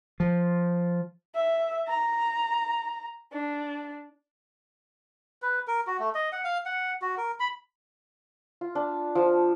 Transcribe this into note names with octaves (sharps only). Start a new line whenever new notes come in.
F3
E5
A#5
D4
B4
A#4
F#4
A3
D#5
F#5
F5
F#5
F#4
A#4
B5
F4
D4
F3